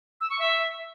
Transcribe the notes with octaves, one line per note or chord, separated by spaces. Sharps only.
E6
C#6
E5